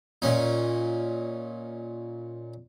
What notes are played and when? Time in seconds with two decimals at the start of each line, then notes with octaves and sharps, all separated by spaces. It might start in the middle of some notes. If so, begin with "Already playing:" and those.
0.22 A#2 C#4 D#4